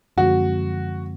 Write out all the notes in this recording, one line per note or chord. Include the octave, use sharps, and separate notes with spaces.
F#2 D3 F3 G#3 C4 F#4